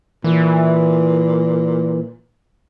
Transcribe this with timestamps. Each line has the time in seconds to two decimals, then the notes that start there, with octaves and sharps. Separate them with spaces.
0.24 A#2 E3